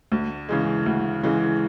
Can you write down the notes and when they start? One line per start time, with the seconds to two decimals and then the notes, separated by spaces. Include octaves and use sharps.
0.12 D2
0.49 C#3 E3 G#3
0.86 D2
1.23 C#3 E3 G#3